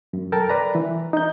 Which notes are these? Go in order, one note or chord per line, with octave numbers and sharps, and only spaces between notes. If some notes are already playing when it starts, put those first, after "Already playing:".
F#2
A4 A#4 G5 A5
B4 D5 A#5
E3
D#4 G6